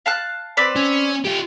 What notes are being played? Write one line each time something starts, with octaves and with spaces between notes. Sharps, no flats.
F5 A5 F#6
C4 B4 D5
C#4
F4 G4